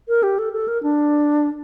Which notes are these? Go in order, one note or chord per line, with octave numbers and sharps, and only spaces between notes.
A#4
G4
A4
A4
A#4
D4